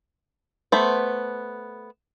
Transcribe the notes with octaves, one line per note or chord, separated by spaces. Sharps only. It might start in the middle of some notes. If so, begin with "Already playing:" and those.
A3 B3 C5